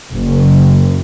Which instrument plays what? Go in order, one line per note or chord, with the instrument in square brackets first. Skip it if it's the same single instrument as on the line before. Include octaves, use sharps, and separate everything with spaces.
[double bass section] F#1